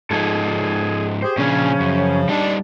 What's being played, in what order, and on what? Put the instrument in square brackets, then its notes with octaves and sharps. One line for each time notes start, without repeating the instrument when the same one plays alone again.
[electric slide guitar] G#2 F3 D#4 [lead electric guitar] G#4 A4
[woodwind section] G4 G#4 [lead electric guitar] C5
[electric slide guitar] A#2 D4 G#4 [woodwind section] C#3 F3 [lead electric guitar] C#4
[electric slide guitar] F#2
[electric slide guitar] G3 D#4 [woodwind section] D4